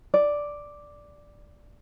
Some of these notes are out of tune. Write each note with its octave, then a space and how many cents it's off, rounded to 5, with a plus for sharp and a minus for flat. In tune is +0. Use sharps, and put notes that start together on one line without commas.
D5 +0